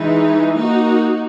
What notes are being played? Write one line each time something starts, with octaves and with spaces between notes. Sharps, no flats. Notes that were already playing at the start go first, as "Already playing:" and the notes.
Already playing: E3 G#3 D#4
A#3 D#4 F#4